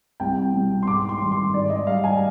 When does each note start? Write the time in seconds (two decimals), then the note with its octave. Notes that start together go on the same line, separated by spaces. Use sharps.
0.20 C2 G5
0.54 B2 G3
0.83 C6
0.87 G#2 D6
1.09 C6
1.20 D#3 G3
1.32 C6
1.54 G#2 D5
1.70 D#5
1.87 G3 F5
2.04 G#5